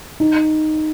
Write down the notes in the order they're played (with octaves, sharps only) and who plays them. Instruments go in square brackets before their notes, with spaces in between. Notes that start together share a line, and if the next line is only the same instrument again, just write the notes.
[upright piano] D#4